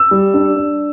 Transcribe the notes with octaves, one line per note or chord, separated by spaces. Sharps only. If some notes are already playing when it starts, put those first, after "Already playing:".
Already playing: E6
G3
D4
D4